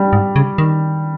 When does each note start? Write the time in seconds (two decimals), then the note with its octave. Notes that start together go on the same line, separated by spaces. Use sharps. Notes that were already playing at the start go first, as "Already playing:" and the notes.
Already playing: G3
0.13 G#2
0.36 C#3
0.58 D#3